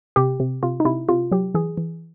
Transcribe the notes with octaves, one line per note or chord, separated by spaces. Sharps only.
C3 G4
C3
C3 F4
D#4
C3 E4
C3 F4
F#3 G4
E3 G#4
E3